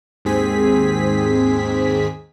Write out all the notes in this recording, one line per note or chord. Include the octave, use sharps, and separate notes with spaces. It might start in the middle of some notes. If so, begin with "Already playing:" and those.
D#2 G#2 C4 G#4 B6